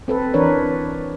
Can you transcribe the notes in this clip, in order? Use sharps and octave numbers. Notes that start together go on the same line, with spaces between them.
C4 A4 B4
E3 D4 A#4 B4 C#5